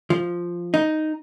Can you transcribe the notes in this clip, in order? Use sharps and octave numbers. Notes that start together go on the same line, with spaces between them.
F3
D#4